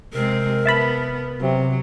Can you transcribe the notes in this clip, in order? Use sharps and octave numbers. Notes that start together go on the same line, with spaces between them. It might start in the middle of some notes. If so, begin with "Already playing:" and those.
C3 G#3 C4 A#4
B3 E5 A5 B5
C3 F#3